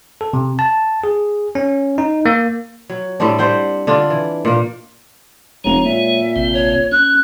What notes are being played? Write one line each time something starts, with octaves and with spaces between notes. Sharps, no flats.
A4
C3
A5
G#4
C#4
D#4
A#3
F#3
A2 G3 C4 D4
G3 C5 F#5 G5
D3 D4 F4
E3
A#2 A#3
F1 G#3 C#5 A#5
A#2 E5
A1 C3 C4
C#5
C#4 F#6